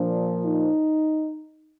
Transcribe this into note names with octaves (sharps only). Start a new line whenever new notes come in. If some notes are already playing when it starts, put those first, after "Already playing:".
Already playing: A#2 F3 D4
D#4